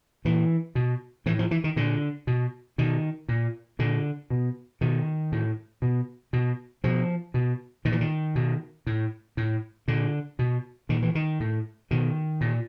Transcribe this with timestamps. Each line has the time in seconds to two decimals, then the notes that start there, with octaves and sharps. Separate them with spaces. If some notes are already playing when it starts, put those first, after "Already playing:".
0.25 A#2 E3
0.75 B2
1.26 A2 E3
1.39 F3
1.51 E3
1.64 D#3
1.76 A#2 D3
2.27 B2
2.78 B2 D#3
3.29 A#2
3.79 A#2 D3
4.30 B2
4.81 B2 D#3
5.32 A2
5.82 B2
6.33 B2
6.84 B2 F3
7.34 B2
7.85 A#2 D#3
7.92 E3
8.01 D#3
8.35 B2
8.87 A2
9.37 A2
9.88 A#2 D3
10.39 B2
10.89 A#2 D#3
11.02 E3
11.15 D#3
11.40 A2
11.91 B2 D#3
12.41 A#2